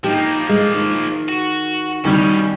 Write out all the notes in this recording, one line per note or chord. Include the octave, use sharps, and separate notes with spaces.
F3 A#3 D#4 G4
G#3
D#3
F#4
B2 D#3 G3 C#4